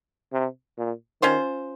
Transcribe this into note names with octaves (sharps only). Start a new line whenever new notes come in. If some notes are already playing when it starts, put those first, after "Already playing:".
C3
A#2
D#3 C#4 F4 C5